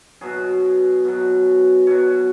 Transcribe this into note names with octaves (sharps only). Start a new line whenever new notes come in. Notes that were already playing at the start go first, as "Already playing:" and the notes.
B2 F#3 G#4
B2 F#3
B2 F#3 C#5